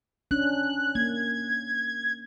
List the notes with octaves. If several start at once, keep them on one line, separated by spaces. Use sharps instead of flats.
C#4 D4 F#6
A#3 G#6